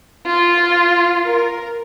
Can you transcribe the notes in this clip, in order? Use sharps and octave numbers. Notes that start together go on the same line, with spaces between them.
F4
A#4